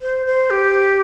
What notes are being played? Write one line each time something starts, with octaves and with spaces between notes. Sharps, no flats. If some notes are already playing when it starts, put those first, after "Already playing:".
C5
C5
G4